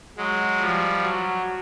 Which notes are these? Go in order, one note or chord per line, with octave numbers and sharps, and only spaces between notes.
F#3 G#3
F3 G3
F#3